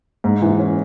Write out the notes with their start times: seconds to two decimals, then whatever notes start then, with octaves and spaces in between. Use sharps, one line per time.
0.24 G#2
0.42 E3
0.59 C#4